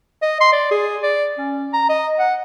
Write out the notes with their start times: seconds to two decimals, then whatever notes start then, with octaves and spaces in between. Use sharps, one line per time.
0.22 D#5
0.41 C6
0.53 D5
0.71 G#4
1.03 D5
1.38 C#4
1.73 A#5
1.89 D#5
2.19 F#5